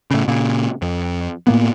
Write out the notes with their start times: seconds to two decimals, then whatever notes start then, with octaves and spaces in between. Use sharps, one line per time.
0.11 A2 C#3
0.28 A#2 C#3
0.82 F2
1.47 A2 A#3 B3